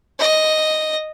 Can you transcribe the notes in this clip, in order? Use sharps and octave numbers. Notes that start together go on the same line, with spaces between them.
D#5